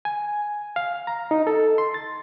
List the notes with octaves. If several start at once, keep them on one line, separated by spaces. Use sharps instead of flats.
G#5
F5
A#5
D#4
A4
C6
A6